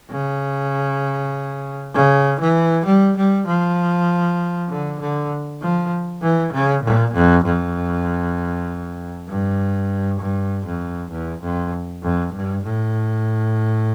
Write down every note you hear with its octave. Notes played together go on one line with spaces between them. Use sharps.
C#3
C#3
E3
G3
G3
F3
D3
D3
F3
E3
C#3
A#2
F2
F2
G2
G2
F2
E2
F2
F2
G2
A2